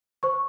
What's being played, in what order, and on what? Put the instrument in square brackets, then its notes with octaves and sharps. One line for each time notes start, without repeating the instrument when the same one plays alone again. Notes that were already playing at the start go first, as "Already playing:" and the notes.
[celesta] C5 C#6